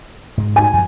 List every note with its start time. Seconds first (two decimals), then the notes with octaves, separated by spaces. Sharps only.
0.38 G#2 G#3
0.56 G#5
0.74 F#2 F3 F#3